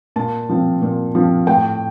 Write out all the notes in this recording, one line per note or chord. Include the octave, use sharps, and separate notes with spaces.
A#2 A5
F3 C4
A#2
F3 C4
A2 G5